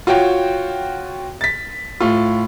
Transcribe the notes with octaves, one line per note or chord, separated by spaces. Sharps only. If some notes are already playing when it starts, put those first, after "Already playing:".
F4 F#4 C#5 G5
A6 B6
A2 F4